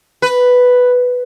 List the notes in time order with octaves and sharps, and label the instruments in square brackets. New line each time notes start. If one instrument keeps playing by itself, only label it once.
[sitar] B4